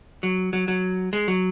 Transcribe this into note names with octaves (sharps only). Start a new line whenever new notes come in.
F#3
F#3
F#3
G#3
F#3